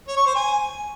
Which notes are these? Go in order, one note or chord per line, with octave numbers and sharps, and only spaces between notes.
C#5
C#6
C5
G#5